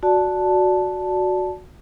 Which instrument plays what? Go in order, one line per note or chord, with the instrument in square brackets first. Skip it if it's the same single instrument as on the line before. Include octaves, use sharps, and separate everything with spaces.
[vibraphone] F#4 D5 A5